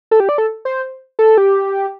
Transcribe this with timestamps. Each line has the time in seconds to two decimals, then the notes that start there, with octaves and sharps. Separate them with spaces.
0.11 A4
0.20 G4
0.29 D5
0.38 A4
0.65 C5
1.19 A4
1.38 G4